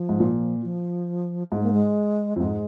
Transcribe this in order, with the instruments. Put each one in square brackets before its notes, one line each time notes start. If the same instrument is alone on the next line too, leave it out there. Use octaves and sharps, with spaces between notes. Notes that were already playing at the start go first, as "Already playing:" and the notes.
Already playing: [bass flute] F3
[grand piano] G#2
A#2
[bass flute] F3
[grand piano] G#2 [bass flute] G#3
[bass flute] A#3
G#3
[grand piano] F2
[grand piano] G#2 [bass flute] G#3